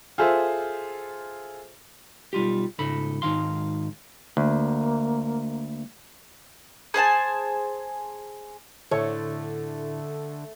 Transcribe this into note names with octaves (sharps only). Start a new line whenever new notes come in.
F4 G#4 A4 C5 E5
B1 G3 F4 G4
C#2 G#2 A4 B5
G#2 D#3 F5 C6
D2 A#3
G#4 C5 G#5 A5
A2 D3 A3 E4 C#5